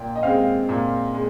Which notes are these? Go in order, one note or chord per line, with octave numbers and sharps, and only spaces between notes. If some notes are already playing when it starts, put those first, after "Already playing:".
Already playing: A#2 G5
D#5
G#3 C4 F5
A#2
G#3